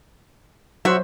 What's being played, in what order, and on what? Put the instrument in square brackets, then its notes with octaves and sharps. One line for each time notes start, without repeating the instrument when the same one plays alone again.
[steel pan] F#3 C5 [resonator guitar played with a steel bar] F#4 E5